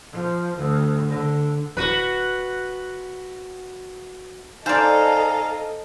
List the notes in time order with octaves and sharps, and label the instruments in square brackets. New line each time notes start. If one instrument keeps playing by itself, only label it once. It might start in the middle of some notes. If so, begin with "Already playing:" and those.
[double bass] F3
D2
D3
[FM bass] D1 [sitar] F#4 B4
[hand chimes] D#4 G#5 A#5 [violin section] A4 D#5 [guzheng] C5 D5 [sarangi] F5